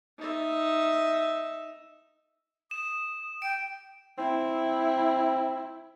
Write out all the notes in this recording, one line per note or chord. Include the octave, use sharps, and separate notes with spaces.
D#4 E5
D#6 E7
G5 D7
C4 E4